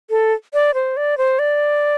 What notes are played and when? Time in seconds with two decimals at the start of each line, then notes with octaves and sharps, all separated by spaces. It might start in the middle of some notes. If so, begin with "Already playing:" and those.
0.10 A4
0.54 D5
0.74 C5
0.97 D5
1.18 C5
1.39 D5